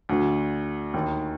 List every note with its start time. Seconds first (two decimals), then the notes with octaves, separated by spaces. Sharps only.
0.09 D2 D3
0.94 D#2 D#3